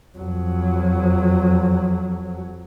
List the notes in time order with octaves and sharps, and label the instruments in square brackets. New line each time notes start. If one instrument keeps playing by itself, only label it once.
[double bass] F2 F#3